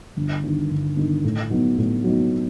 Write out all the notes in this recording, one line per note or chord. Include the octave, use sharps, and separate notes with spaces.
G1
G2 D#3
G1
G2 D#3
A2
F#3 B3 D#4
A2
F#3 B3 D#4